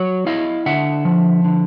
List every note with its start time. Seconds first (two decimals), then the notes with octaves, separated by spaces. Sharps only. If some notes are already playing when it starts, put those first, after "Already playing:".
Already playing: F#3 C#5
0.26 E4 D#5 F5
0.66 D3 E5 F#5
1.05 F3
1.45 D3